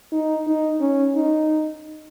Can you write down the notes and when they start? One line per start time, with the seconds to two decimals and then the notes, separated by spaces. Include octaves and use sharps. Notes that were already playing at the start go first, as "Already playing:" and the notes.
0.12 D#4
0.47 D#4
0.81 C#4
1.15 D#4